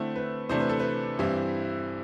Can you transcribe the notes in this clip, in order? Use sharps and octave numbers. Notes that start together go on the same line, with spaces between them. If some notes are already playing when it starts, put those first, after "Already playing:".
Already playing: D3 A3 C4 E4
B4
C3 E3 A3 D4 C5
B4
A4
B4
G2 E3 G3 C4 E4